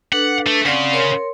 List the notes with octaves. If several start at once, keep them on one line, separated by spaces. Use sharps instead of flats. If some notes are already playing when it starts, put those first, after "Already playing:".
D4 A4 B4 F#5
A3
C#3 C4 D5 F#5
A#4 C#5 C6